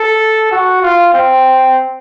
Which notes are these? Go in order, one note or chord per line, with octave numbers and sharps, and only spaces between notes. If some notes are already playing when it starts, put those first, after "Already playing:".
Already playing: A4
F#4
F4
C4